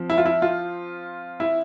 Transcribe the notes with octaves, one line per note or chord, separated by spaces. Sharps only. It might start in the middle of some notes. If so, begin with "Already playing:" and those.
Already playing: F3 C4
E4
F4
E4
F4
E4